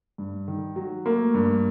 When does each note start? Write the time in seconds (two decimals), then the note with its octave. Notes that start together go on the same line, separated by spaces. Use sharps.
0.18 G2
0.48 D#3
0.76 F#3
1.06 A3 A#3
1.34 G2